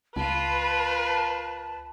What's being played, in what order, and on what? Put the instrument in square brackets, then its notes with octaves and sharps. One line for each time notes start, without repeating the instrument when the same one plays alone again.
[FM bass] C#2 [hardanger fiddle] F4 [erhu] B4 [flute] A5